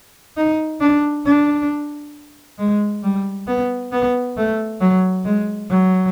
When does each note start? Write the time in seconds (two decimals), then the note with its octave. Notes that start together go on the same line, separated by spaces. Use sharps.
0.37 D#4
0.81 D4
1.26 D4
2.59 G#3
3.03 G3
3.48 B3
3.92 B3
4.37 A3
4.81 F#3
5.25 G#3
5.70 F#3